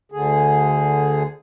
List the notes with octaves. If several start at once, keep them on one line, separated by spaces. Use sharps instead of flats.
D2 D3 G#4